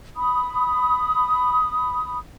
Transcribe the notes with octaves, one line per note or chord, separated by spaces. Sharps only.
B5 D#6